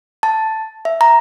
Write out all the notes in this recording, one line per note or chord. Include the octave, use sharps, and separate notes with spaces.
A5
E5
A#5